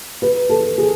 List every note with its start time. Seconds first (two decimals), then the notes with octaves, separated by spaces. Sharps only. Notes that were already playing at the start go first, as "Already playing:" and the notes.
0.22 B4
0.49 A4
0.78 G#4